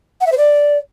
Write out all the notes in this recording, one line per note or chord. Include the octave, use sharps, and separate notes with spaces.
F#5
E5
C5
D5